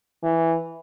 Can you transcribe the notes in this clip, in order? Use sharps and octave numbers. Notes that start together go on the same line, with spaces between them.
E3